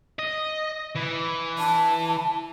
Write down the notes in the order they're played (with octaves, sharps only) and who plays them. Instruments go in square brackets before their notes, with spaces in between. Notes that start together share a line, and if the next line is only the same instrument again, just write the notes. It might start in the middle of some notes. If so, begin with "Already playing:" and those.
[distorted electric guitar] D#5
E3
[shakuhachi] A5